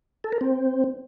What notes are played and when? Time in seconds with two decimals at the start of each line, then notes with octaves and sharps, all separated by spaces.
0.24 A4
0.33 A#4
0.41 C4